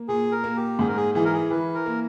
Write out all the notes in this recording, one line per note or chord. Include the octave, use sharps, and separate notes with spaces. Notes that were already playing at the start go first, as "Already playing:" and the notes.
Already playing: A#3
A#2 G#4
A#4
A#3
G4
G#2 G#4
A#4
G#4
E3 G#4
A#4
G#4
E3 B4
A#4
A#3